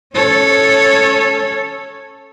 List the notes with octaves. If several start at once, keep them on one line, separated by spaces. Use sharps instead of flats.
C#4 A4 C#5